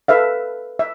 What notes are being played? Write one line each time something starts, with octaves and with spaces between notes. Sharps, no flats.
A4 B4 E5 F5
E5